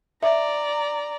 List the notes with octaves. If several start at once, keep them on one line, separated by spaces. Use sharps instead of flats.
D5 E5 A#5